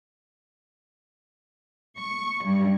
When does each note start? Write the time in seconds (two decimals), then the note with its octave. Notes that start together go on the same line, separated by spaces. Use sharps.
1.99 C#6
2.45 G2